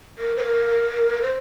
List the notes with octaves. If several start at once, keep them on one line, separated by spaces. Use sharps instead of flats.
A#4
C5
A#4
C5